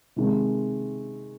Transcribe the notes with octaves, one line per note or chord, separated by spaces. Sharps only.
C3 D#3 G#3